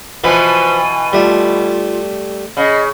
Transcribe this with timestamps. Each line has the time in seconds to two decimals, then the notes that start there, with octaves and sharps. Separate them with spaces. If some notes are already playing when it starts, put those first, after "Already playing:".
0.24 B2 E3 F3 B4 G#5
1.13 G3 A3 F4
2.57 C#3 D#5